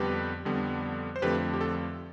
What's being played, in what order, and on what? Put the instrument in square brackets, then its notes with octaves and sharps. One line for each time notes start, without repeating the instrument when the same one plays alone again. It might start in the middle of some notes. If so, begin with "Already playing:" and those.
Already playing: [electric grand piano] F2 D3 G3 B3 G4 B4
F2 D3 G3 B3
C5
F2 D3 F3 A3 C4 G4 B4
G4
A4